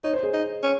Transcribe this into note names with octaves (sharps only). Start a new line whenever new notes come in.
D#4 C#5
C5
G#4
D#4
C#4